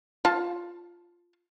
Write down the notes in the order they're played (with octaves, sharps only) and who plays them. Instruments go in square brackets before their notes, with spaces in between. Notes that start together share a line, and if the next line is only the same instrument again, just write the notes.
[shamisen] F4 A5